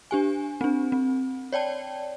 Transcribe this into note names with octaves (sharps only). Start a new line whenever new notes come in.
D4 G4 G#5
C4 D4
C4
C#5 D5 G5 A5